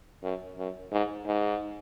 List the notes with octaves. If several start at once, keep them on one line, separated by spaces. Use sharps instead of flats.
F#2
F#2
G#2
G#2